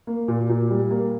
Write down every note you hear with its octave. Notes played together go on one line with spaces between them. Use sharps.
A#3
A#2
A#2
G3
A#3